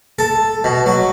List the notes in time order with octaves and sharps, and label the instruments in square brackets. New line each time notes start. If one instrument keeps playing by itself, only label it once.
[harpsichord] A4
B2
F#3